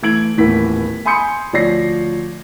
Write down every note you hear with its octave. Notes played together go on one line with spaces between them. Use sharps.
E3 A3 G#6 D7 F#7
D#1 A2 E3 A#3 B3 B6
G#5 B5 C6 D#6 G6 C#7
D2 F3 C#5 D5 A#6 C7